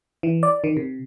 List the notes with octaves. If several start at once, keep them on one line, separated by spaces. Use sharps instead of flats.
E3
D5
D#3
C3